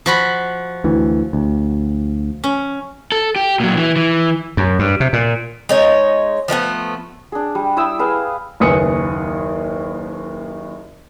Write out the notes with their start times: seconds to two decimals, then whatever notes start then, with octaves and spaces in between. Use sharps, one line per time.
0.06 F3 F#4 B5
0.84 D2 E3
1.33 D2
2.44 C#4
3.12 A4
3.36 G4
3.60 A#2 F#3
3.76 E3
3.96 E3
4.57 F#2
4.79 G2
5.00 C3
5.13 A#2
5.69 G#3 D#4 C#5
6.48 F3 G#3 A3 B3
7.32 D4 G#4
7.55 G3
7.77 E4 G5 D#6 E6
7.99 G#4 B4 F5
8.60 F#1 D#2 B4 G#5 D#6 C#7